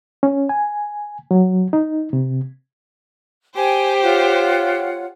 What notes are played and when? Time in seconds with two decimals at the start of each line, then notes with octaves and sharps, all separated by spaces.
0.23 C#4
0.49 G#5
1.31 F#3
1.73 D#4
2.13 C3
3.55 G4 C5 G5 G#5
4.03 F4 C#5 F#5